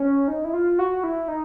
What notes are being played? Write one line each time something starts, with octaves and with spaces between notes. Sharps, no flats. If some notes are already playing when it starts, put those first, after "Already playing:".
Already playing: C#4
D#4
E4
F4
F#4
E4
D#4